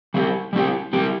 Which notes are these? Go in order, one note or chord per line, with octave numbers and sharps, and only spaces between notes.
G3 C4 G4
G3 C4 G4
G3 C4 G4